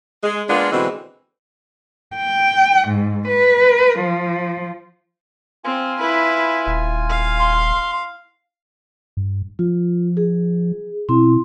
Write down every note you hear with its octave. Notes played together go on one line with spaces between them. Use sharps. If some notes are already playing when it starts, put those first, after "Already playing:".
G#3
G#3 A#3 B3 D4 F4
B2 D3 E3 G#3 C4
G5
G#2
B4
F3
C4 F4 G#5
E4 B4
D#1
F5
C6
G2
F3 F4
G#4
B2 C4 E4 C6